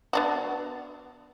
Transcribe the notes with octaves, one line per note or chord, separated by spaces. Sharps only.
B3 D4 F#4